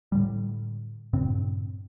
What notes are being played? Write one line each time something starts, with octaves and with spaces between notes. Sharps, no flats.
A2 D3 G3
G2 A#2 C#3 C4